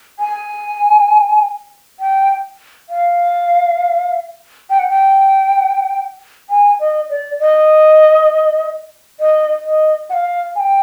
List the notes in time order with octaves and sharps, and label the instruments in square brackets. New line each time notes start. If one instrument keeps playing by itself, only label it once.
[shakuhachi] G#5
G5
F5
G5
F#5
G5
G#5
D#5
D5
D#5
D#5
D#5
F#5
F5
G#5
G5